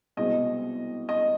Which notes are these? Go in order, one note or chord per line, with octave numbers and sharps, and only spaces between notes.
C2 B2 G#3 C4 D#5
D#5